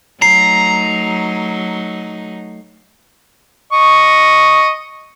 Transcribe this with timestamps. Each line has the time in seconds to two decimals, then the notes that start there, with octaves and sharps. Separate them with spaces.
0.22 F#3 A3 D#4 A#5 C7
3.73 D#5 C#6